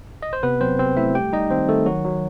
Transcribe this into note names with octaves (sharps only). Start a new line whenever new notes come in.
D#5
C5
C3 B3 B4
F#3 C4 C5
C3 C4 C5
A3 E4 E5
G3 G4 G5
G3 D#4 D#5
D#3 C4 C5
D#3 A3 A4
D#3 F#3 F#4
F#3